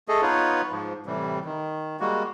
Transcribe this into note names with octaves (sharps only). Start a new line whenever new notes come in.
A3 G#4 A4 D#5
B3 D#4 F4 B4 C#5
G#2 F3
A2 C3 E3 G3
D#3
G3 G#3 A#3 F#4